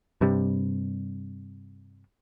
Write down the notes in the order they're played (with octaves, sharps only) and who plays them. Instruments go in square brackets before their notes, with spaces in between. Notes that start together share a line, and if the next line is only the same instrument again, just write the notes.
[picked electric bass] G2 C3 G3